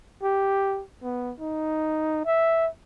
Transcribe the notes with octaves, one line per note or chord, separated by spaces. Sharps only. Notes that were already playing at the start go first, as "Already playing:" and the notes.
G4
B3
D#4
E5